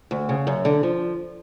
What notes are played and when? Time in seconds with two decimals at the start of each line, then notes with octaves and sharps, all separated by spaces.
0.11 D2
0.29 C#3
0.47 F#2
0.65 D3
0.83 F3